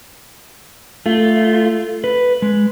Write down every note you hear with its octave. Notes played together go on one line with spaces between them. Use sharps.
A3 F4
B4
G#3